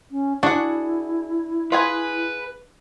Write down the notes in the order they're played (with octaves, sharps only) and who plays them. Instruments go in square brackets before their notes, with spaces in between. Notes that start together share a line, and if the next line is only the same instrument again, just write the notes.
[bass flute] C#4
[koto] D4 [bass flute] E4 [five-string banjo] F#4 G#4 F#5
[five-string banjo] F4 G#4 G#5 [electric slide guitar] B4